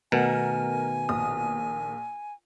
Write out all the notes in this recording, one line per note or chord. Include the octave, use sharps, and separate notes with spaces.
B2 D#3 A3 A#4 F#5 G#5
A#1 D#6